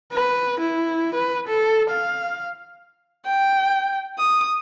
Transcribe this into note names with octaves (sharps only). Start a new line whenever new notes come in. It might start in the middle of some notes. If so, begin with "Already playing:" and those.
B4
E4
B4
A4
F5
G5
D#6